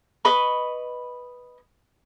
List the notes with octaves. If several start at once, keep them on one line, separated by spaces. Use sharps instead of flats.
B4 D#5 B5 C#6